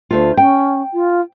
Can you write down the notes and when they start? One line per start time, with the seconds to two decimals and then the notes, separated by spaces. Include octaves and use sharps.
0.11 D2 A3 F4
0.37 C#4 G5
0.94 F4